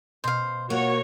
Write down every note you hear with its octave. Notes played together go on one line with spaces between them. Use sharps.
B2 C5 F5
A#3 F4 F#4 A#4 C#5 F#5